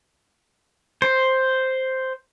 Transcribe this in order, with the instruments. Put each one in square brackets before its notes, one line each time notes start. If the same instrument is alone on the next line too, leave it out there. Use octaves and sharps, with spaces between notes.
[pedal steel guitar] C5